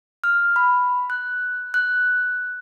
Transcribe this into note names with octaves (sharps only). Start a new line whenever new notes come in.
F6
B5
F#6
F#6